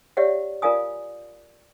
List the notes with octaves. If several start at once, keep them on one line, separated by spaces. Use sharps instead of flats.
G4 C#5 D5 E5 F#5
F4 A#4 D5 F5 G#5 D#6